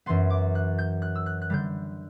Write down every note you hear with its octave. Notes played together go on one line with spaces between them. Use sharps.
F#2 E3 B3 C6
D6
F#6
G6
F#6
E6
F#6
F#6
D3 G3 G6